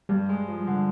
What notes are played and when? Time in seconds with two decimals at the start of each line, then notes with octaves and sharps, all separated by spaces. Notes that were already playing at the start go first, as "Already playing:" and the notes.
0.09 G2 G3
0.29 G#3
0.48 F3
0.67 D3